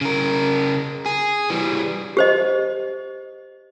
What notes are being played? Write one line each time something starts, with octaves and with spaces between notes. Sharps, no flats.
C#3 A#4
G#4
E3 G3
G4 C5 D#5